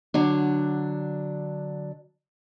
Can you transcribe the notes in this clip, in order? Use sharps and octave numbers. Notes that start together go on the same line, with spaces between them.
D3 F#3 D4